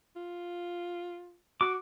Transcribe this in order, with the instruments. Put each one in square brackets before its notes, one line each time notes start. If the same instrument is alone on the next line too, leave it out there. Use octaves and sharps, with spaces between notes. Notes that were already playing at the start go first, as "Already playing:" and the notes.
[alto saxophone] F4
[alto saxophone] F#4 [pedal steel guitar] D6